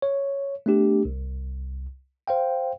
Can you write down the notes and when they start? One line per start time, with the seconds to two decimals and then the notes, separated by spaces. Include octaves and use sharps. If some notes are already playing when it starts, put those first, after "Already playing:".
0.02 C#5
0.66 A3 B3 D4 G4
1.05 C2
2.28 C5 F5 G5